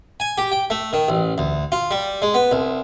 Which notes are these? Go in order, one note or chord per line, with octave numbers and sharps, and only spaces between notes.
G#5
G4
G5
A3
D#3
A1
D2
F4
G3
G#3
B3
C2